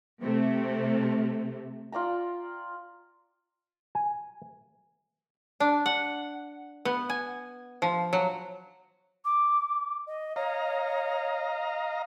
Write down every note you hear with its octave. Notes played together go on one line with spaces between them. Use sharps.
C3 A3
F4 D5 G5 A#5
G#5
D4
F#5
B3
G#5
F3
F#3
D6
D#5
C#5 D#5 F5 A#5